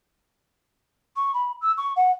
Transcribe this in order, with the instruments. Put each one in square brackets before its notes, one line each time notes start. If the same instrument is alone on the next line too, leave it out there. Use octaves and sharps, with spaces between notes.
[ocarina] C#6
B5
E6
C#6
F#5